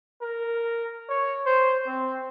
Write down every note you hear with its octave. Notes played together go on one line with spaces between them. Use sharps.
A#4
C#5
C5
C4